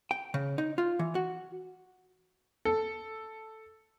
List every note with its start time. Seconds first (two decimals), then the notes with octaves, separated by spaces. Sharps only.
0.11 G5
0.34 C#3
0.58 D#4
0.78 F4
0.99 E3
1.15 F#4
2.65 A4